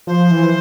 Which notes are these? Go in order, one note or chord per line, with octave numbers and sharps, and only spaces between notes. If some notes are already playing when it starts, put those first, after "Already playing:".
F3 C5
E3